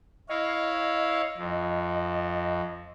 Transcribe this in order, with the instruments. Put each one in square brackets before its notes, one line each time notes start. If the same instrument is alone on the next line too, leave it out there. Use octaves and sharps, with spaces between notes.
[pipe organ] E4 C#5 F5 [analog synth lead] D#5
[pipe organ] F2